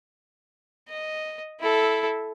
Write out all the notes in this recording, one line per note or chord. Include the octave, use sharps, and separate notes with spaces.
D#5
E4 A4